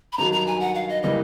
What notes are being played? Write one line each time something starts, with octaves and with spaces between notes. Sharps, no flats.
B5
G2 D#3 F#3 A#5
A#5
G#5
F#5
F5
D#5
C#3 E3 G3 A#3 D#5